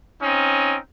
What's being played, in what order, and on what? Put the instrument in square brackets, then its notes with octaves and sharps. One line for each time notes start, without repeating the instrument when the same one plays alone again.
[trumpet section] C4 C#4 D#4